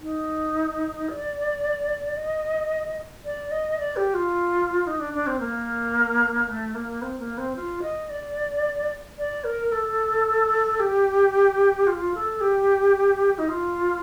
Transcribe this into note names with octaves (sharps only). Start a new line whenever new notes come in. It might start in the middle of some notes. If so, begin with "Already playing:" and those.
D#4
D5
D#5
D5
D#5
D5
G4
F4
D#4
D4
D4
C4
A#3
A3
A#3
C4
A#3
C4
F4
D#5
D5
D5
A#4
A4
G4
F4
A4
G4
D#4
F4